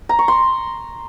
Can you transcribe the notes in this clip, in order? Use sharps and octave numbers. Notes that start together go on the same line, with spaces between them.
A#5
C#6
C6